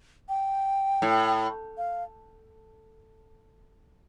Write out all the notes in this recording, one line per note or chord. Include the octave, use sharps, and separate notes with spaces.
G5
A2
F5